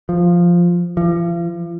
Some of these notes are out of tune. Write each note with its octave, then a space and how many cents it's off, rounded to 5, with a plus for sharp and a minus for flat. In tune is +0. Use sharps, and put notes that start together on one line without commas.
F3 +0
F3 -40